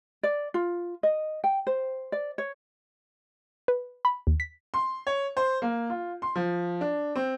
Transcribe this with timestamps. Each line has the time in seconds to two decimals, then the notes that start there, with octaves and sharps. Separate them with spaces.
0.23 D5
0.54 F4
1.03 D#5
1.44 G5
1.67 C5
2.12 D5
2.38 C#5
3.68 B4
4.05 B5
4.27 D#2
4.40 B6
4.74 C6
5.07 C#5
5.37 C5
5.62 A#3
5.90 F4
6.22 C6
6.36 F3
6.81 D4
7.16 C4